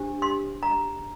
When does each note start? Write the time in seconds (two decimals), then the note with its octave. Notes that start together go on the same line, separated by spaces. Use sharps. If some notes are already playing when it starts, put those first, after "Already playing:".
Already playing: D4 G4 C5
0.22 C6
0.63 A#5